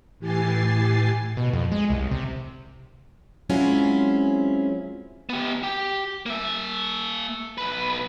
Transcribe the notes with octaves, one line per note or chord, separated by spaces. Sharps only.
A2 E3 G4 G#5 A6 C7
B2
F2
G#3
C2
C3
F#3 G#3 C4 C#4 E4 F4
B3 G4
G4
A#3 E5
B1 B4